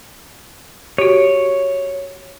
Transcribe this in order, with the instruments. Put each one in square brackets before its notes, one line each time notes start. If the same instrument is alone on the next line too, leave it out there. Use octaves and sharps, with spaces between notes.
[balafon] F#4 G4 [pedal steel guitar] C#5